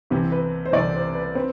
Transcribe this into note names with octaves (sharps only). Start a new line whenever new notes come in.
C2 C3 E3 G4
B4
C5
C2 C3 E3 D5
C5
B4
C4 B4